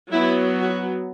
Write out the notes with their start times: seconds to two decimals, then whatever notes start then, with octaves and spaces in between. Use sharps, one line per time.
0.11 F#3 B3 E4
0.59 F#4